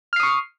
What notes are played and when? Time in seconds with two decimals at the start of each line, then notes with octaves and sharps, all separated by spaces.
0.13 F6
0.16 C7
0.20 D#6
0.23 C#6